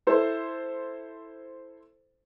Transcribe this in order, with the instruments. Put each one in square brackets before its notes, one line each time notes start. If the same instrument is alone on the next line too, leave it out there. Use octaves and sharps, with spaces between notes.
[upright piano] E4 A4 C5